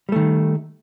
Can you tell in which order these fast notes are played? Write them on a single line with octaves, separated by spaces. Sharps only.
G3 A3 D#3